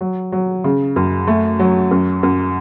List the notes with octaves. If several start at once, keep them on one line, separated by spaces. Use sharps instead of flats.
F#3
F#3
C#3
F#2
A3
F#3
F#2
F#2